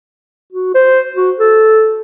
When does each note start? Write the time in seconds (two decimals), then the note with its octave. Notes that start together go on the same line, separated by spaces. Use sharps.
0.53 F#4
0.75 C5
1.16 F#4
1.39 A4